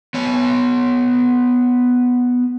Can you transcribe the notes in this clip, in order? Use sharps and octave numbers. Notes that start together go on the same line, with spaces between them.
B3 C#5